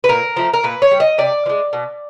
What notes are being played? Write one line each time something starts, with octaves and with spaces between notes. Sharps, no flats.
B4
A#2 A#4
F3 A3
A#4
A#2 B4
C#5
G3
D#5
C3 D5
F3
G#3
B2